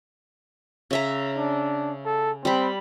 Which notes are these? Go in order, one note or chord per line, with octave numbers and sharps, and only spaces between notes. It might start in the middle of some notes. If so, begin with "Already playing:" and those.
C#3 E5 A#5
D4
A4
G3 C4 B5